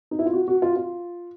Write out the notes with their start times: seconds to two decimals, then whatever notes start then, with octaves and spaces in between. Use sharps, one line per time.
0.11 D#4
0.19 E4
0.26 F4
0.33 F#4
0.48 F#4
0.62 F4
0.76 F4